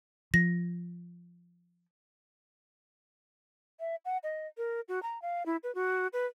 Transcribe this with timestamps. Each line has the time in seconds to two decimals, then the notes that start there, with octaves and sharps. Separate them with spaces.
0.34 F3 A#6
3.80 E5
4.05 F#5
4.23 D#5
4.58 A#4
4.88 F#4
5.03 A#5
5.22 F5
5.46 E4
5.63 B4
5.75 F#4
6.13 B4